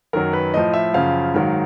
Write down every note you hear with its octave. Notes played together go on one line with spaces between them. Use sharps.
F#2 D#3 F#3 A#4
B4
A2 F3 D#5
E5
F#2 C#3 F3 F5
G#2 D#3 F#3